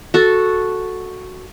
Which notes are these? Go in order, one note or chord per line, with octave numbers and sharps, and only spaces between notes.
F#4 A4